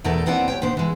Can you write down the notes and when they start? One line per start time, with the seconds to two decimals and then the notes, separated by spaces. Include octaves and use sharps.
0.04 E2 B2 A3 A4 A#4 D5
0.26 D#2 B3 C4 E4 D5 F#5
0.48 D2 C#5 G5
0.62 A#2 D#3 D4 C5
0.77 E3 G#3